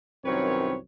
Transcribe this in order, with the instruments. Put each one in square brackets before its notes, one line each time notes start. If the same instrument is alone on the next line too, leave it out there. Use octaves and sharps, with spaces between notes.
[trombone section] C2 F#2 C4 [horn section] D#3 B4 C#5